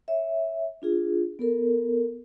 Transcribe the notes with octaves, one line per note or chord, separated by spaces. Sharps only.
C#5 E5
D4 F4 G#4
B3 A4 A#4